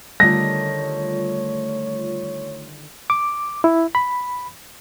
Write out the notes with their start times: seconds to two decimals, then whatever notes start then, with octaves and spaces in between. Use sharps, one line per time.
0.20 D3 D#3 G3 A3 F4 C#5 D#6 A#6
3.10 D6
3.64 E4
3.95 B5